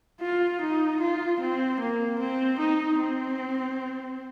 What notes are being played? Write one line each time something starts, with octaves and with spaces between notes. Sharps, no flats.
F4
D#4
F4
C4
A#3
C4
D#4
C4